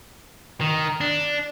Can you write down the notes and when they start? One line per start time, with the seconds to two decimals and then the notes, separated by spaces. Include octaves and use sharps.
0.61 D#3
1.01 D4